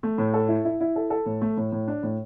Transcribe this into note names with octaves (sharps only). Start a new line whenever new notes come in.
A3
A2
A4
E4
E4
E4
A4
A4
A2
A3
A2
A2
D4
A2